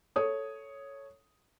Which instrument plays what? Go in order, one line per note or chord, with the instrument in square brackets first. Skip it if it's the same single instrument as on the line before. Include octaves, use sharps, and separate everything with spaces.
[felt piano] A4 C#5 D#6